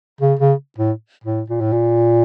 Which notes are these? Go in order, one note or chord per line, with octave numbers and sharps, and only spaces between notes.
C#3
C#3
A2
A2
A#2
A2
A#2